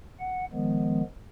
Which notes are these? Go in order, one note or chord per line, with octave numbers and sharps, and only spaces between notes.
F#5
D#3 F3 G#3 B3